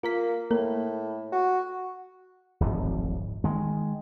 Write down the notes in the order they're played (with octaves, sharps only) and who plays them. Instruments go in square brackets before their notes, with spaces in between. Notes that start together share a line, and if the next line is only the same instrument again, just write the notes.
[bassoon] A#3 [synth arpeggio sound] F4 A#4 B6
[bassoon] A2 [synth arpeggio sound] A#3 A#4
[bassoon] F#4
[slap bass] D1 G#1 F2
D#3 G#3